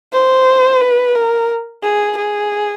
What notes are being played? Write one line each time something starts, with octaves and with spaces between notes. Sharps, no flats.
C5
B4
A#4
G#4
G#4